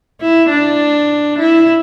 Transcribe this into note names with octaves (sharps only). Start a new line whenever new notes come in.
E4
D4
E4